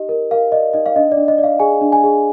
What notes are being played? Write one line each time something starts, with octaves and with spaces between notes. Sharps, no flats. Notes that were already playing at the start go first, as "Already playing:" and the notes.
Already playing: D#4 G4 D#5
A#4
A#4 F5
D5 D#5
D#4 D#5
F5
D4 D#5
D5
D4
D#5
D5
F5
G#4 G#5
D4
G#5
G#4